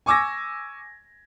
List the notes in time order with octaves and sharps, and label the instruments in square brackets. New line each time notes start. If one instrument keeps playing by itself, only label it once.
[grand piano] G#5 C#6 D6 E6 G#6 A#6